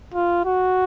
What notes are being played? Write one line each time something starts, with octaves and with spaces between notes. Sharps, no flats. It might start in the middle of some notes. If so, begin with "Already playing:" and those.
F4
F#4